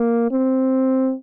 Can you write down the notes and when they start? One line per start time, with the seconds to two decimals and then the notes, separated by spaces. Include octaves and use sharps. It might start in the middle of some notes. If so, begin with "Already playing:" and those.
Already playing: A#3
0.31 C4